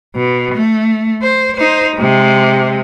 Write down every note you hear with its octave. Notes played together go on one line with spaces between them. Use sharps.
B2
A3
C5
D#4 C5
C3 G#3